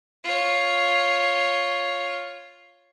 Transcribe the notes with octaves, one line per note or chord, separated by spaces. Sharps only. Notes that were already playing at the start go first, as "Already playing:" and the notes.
F4 C#5